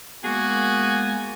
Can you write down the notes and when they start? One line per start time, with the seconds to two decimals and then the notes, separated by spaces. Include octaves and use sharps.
0.24 G#3 A#3 B3 F#4 G#4 G#5